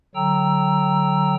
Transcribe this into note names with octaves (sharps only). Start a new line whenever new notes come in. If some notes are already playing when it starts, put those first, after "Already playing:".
D3 F#3 G5 A#5 E6